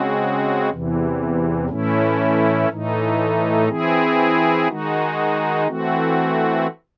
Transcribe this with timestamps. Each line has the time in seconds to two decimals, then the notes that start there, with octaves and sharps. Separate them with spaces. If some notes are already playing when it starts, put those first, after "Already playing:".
Already playing: C#3 G#3 C4 F#4
0.70 E2 C3 E3
1.69 A2 E3 A3 C#4 E4
2.69 A2 E3 A3 D#4
3.68 E3 C4 E4 G#4
4.68 D#3 G#3 D#4 F#4
5.67 E3 A3 C4 F#4